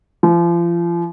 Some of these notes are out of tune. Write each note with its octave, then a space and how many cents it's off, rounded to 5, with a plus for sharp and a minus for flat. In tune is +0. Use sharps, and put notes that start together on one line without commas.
F3 -35